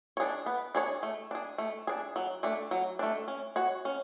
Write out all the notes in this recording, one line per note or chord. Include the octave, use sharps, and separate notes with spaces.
C#5
D4 G#4
B3
D4 G#4 C#5
A3
D4 G#4
A3
D4 G#4
F#3
A3 D4
F#3
A3 D4
C#4
F#4 C#5
C#4